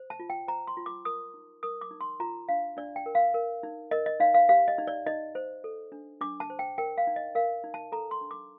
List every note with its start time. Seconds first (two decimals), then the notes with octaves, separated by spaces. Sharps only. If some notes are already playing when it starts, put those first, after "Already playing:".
Already playing: C5
0.10 A5
0.20 F4
0.30 G5
0.48 C5 A#5
0.67 C6
0.77 F4
0.86 D6
1.05 A#4 D#6
1.34 D#4
1.63 A#4 D#6
1.81 D6
1.91 D#4
2.01 C6
2.20 F4 A#5
2.48 D4 F5
2.77 D4 D5
2.96 G5
3.06 A#4
3.15 F5
3.34 A#4
3.63 D#4
3.91 A#4 D#5
4.06 D#5
4.20 D#4 F5
4.34 F5
4.49 G4 F5
4.68 D#5
4.78 D#4
4.87 D5
5.07 D#4 D#5
5.35 C5
5.64 A4
5.92 D4
6.21 D4 D6
6.40 A5
6.50 C5
6.59 G5
6.78 A#4 G5
6.98 F5
7.07 D#4
7.16 D#5
7.35 A#4 F5
7.64 D#4
7.74 A5
7.92 A4 A#5
8.11 C6
8.21 D4
8.31 D6